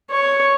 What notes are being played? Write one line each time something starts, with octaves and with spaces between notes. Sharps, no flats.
C#5